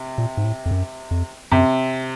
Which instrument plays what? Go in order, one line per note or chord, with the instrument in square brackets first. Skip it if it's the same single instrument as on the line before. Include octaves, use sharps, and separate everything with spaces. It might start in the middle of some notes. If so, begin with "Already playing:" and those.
Already playing: [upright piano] C3
[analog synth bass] A#2
G#2
A2
F2
F#2
F2
[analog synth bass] F#2 [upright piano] C3